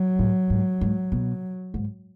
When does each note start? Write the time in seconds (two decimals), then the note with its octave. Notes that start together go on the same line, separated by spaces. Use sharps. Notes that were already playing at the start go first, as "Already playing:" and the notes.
Already playing: F#3
0.19 A2
0.50 G#2
0.81 G#2
1.12 B2
1.74 G#2